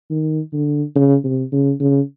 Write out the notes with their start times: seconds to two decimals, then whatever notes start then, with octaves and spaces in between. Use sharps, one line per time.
0.10 D#3
0.53 D3
0.96 C#3
1.24 C3
1.53 C#3
1.80 C#3